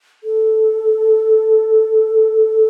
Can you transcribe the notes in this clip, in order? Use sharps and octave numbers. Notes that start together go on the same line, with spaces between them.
A4